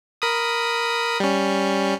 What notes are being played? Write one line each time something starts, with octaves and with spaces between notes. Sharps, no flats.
A#4 B5 D#6
G3 C#4